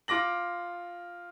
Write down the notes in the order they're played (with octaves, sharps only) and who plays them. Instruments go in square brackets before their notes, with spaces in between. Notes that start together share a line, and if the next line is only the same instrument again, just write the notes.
[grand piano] F4 D6 A#6 F#7